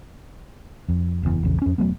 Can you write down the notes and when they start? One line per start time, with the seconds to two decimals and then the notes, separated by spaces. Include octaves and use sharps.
0.89 F2
1.23 F#1 E2
1.43 A#1 E2 C#3
1.62 F2 C#4
1.78 E1 F#3 A3 B3